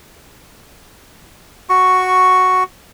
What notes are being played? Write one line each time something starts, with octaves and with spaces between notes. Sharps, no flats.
F#4 C#6